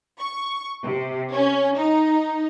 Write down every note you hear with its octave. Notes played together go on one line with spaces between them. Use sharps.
C#6
C3
C#4
D#4